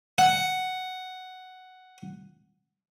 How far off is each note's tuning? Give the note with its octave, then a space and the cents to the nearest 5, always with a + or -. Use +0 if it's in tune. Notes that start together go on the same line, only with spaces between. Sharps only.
F#5 +5